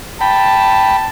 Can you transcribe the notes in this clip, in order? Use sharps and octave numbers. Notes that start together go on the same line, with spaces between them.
G5 A5 B5